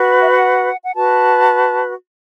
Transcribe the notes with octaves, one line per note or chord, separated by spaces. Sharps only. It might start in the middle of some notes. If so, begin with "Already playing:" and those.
Already playing: F#4 B4
E5
F#5
F#5
F#4 B4 A5